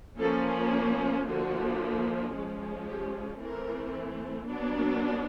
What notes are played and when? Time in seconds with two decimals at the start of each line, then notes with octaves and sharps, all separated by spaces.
0.19 F3 A#3 C#4 A4
1.26 D3 F3 A#3 F#4
2.33 F3 G#3 C#4
2.86 G4
3.40 E3 A3 C4 A#4
4.47 F#3 B3 D4